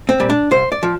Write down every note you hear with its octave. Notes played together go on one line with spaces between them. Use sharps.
C4
A#2 G3
D4
C2 C5
D5
F3